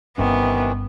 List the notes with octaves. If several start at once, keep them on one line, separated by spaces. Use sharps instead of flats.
G1 G2 C3 D#3 E3 B3 C#4